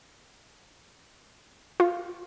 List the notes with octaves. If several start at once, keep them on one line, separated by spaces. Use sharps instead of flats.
F4